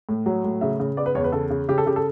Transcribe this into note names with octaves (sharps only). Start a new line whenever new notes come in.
A2
F#3
A2
C#3 E5
C#3
B3 D5
B4
E2 C#5
B4
C#3 A4
C#3
C#3 G4
A4
C#3 G4
A4